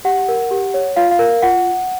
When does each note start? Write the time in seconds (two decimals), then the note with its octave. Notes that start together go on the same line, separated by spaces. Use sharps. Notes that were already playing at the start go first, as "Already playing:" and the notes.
0.05 G4 F#5
0.29 A#4
0.51 G4
0.74 C#5
0.96 F4 F5
1.11 F5
1.19 A#4
1.43 F4 F#5